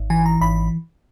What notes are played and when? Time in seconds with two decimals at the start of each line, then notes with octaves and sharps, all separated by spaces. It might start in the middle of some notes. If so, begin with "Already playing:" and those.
Already playing: G#1
0.10 E3 G#5
0.26 A#5
0.41 G#1 B5